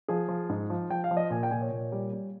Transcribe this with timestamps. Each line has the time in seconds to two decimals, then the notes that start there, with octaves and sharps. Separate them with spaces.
0.08 F3 G#4
0.28 F3
0.49 G#2
0.70 F3
0.90 F3 G5
1.04 F5
1.11 F3
1.17 D#5
1.30 A#2 G#5
1.43 G5
1.51 A#2 G#5
1.62 C#5
1.71 A#2
1.92 G3
2.13 G3